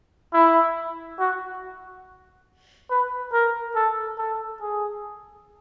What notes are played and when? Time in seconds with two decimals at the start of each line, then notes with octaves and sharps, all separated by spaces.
0.34 E4
1.19 F#4
2.90 B4
3.33 A#4
3.75 A4
4.18 A4
4.61 G#4